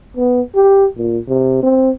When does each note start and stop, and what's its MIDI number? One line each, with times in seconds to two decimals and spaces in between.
0.17 0.41 59
0.55 0.86 67
0.97 1.18 46
1.28 1.59 48
1.63 1.91 60